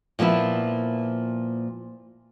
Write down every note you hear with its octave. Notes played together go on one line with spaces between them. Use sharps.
A#2 F3 A#3 B3 E4